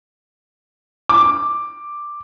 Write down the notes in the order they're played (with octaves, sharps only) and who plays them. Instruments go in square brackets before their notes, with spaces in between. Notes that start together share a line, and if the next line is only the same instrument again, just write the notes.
[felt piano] D6